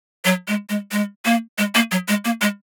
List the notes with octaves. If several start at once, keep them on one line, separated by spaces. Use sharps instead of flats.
F#3
G#3
G#3
G#3
A#3
G#3
A#3
F#3
G#3
A#3
G#3